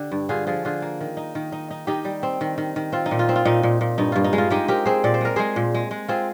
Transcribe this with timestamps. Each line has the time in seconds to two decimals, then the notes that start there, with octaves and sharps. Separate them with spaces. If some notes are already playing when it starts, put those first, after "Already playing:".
Already playing: D3 G4
0.12 G2
0.29 D3 F4 G#4
0.47 F3 F4 G#4
0.65 D3 F4 G#4
0.82 A#3
1.01 D#3
1.17 D#4
1.35 D#3
1.52 D#4
1.71 D#4
1.87 D#3 D#4 G4
2.05 G3
2.23 C4
2.41 D#3
2.58 D#3
2.76 D#3
2.92 C4 F4
3.06 D#4
3.11 A#2
3.19 F4
3.29 C4
3.36 F4
3.45 A#2 D#4
3.63 A#2
3.81 A#2
3.98 G2 D#4
4.12 G2 F4
4.24 D#4
4.33 G#3
4.38 F4
4.50 G#3 D#4 G4
4.68 C4 G4 A#4
4.85 C4 G#4 C5
5.04 A#2 D5
5.14 C5
5.21 G#3 A#4
5.36 G#3 G#4 C5
5.56 A#2
5.74 G#3
5.91 G#3
6.08 C4 F4 G#4